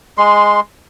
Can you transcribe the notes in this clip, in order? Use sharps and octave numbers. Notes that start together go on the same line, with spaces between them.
G#3 C6